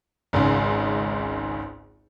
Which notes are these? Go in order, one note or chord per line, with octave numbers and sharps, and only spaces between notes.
G#1 C#2 G#2 C#3